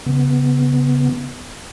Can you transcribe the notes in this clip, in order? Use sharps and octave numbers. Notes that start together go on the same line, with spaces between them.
C#3 B3